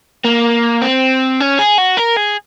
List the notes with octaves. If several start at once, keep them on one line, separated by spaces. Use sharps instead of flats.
A#3
C4
C#4
G#4
F#4
A#4
G#4